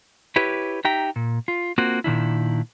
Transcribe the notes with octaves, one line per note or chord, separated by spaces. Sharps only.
E4 G4 B4 C#5 E5
D#4 G4 E5 G5 A#5
A#2
F4
A#3 C4 F4 F#4
A#2 D#3 D4 E4